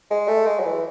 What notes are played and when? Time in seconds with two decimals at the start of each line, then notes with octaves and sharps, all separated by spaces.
0.10 G#3
0.28 A3
0.46 G#3
0.60 F#3
0.65 E3